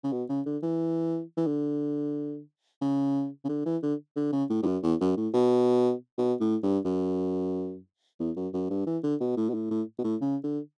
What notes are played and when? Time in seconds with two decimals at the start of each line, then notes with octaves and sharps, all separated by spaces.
0.04 C#3
0.13 B2
0.29 C#3
0.46 D3
0.63 E3
1.37 E3
1.47 D3
2.81 C#3
3.44 C#3
3.49 D3
3.66 E3
3.83 D3
4.16 D3
4.33 C#3
4.50 A2
4.63 G2
4.66 F#2
4.83 E2
5.00 F#2
5.17 A2
5.34 B2
6.18 B2
6.40 A2
6.63 G2
6.85 F#2
8.19 E2
8.36 F#2
8.53 F#2
8.70 G2
8.86 E3
9.04 D3
9.20 B2
9.37 A2
9.50 B2
9.54 A2
9.71 A2
9.99 B2
10.04 A2
10.21 C#3
10.44 D3